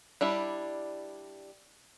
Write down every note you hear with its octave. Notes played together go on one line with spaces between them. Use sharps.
G3 D4 E4